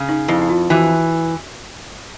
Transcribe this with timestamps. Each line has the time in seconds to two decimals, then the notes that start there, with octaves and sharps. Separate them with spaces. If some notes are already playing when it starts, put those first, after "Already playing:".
Already playing: C#3
0.09 D#4
0.28 F2 E4
0.42 E4
0.50 F4
0.70 E3 F#4